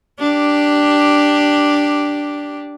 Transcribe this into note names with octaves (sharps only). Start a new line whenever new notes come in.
D4 G4